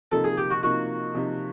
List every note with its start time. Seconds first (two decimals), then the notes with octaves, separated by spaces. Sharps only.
0.12 C3 F3 A#3 D#4 A4
0.24 G#4
0.38 G4
0.51 F#4
0.63 C3 F3 A#3 D#4 F#4
1.15 C3 F3 A#3 D#4